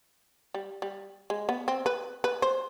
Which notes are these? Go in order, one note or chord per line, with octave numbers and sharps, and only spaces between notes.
G3
G3
G#3
B3
C4
B4
B4
C5